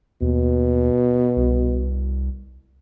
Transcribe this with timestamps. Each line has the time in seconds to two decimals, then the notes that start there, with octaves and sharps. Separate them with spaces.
0.21 D#2 B2
1.36 C2